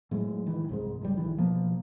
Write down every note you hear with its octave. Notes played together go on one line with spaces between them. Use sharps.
A2 F#3 G#3
D1 D#3 E3
C2 G#2 G#3
G1 C#2 G3
A#1 D#3 E3
B2 F3 A#3